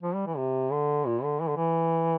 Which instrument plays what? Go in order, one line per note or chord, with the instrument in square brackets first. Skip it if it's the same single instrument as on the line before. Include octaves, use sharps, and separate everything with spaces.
[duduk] F3
G3
E3
C3
D3
A#2
D3
E3
D3
E3